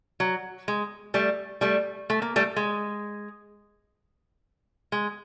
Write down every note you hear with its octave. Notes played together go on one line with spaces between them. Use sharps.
F#3
G#3
G3 A3
G3 A3
A3
A#3
G3 A3
G#3
G#3